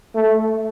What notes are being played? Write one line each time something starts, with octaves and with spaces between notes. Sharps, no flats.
A3